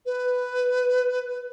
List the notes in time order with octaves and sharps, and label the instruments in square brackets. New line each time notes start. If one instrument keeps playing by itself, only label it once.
[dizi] B4